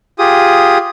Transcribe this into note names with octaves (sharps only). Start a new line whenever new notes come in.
F4 G4 G#4 D#6